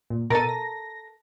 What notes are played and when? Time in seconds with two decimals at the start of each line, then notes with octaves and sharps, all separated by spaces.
0.10 A#2
0.30 B2 A4 A#4 A6 D#7
0.49 A#6